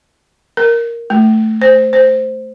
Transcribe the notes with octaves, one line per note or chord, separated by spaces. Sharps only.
A#4
A3
C5
C5